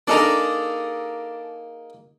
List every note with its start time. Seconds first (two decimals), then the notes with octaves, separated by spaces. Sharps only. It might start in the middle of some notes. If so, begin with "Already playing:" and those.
0.07 A#3 D4 D#4 G#4 A4 A#5